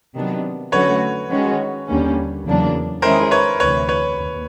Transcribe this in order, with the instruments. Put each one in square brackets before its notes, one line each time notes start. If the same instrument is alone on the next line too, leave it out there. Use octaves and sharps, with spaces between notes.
[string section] C3 D#3 F#3 B3 D4
[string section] D3 F#3 A3 C#4 F#4 [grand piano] B4 C#5
[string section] D#3 G#3 C#4 F#4
D#2 D3 G3 A#3 C#4
E2 C#3 F#3 A#3 D4
[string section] D#3 G#3 C#4 E4 G#4 [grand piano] A#4 C5
[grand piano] B4 C#5
[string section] D2 C3 E3 [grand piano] B4 C#5
[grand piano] B4 C#5
[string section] D#2